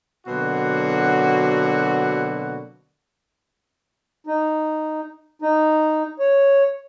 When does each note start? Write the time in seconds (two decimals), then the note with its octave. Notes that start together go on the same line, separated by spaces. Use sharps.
0.27 B2 D3 F#3 A#3 C4 F#4
4.27 D#4
5.42 D#4
6.19 C#5